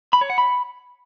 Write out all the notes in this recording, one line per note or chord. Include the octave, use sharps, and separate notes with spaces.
B5
C#5
F#5
B5